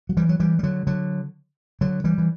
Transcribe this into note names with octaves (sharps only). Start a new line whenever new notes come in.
F#3
E3 G3
F#3
E3 G3
G3
D3 F#3
D3 F#3
D3 F#3
E3 G3
E3